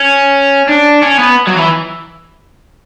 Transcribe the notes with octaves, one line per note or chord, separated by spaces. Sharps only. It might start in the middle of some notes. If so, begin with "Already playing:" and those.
Already playing: C#4
D4
C#4
B3
F#3
E3